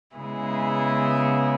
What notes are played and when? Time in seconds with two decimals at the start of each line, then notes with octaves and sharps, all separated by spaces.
0.16 C#3 G#3 B3 E4 G#4